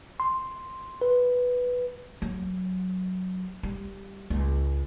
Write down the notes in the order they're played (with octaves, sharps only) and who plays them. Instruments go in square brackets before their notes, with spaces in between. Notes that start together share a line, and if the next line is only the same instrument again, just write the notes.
[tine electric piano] C6
B4
[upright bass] F#3
G3
C#2